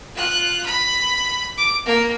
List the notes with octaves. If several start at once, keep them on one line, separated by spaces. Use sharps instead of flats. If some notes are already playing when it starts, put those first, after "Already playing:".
F4 F#6
B5
D6
A#3